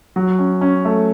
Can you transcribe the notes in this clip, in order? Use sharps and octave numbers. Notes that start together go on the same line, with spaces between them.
F#3
C#4
C#4
A3